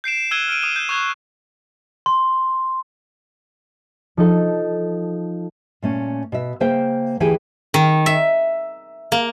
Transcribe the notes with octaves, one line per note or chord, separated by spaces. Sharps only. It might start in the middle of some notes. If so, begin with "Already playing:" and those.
G6 C7 D7 E7
E6 F#6 G#6 D#7 E7 G7
F6 D7 D#7
D#6 D#7 E7
G6
C#6 D#6 F#6 G#6
C6
F3 D#4 A4
A#2 A3 C#4
B2 E5
C#3 A#3 C5 E5 G5
D2 E3 G4 G#4 G5 G#5
D#3
E5
A#3